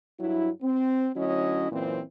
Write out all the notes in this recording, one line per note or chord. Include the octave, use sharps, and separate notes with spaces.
G2 F#3 E4
C4
D2 F#3 C#4 E4 D#5
F#2 A#2 E3 C4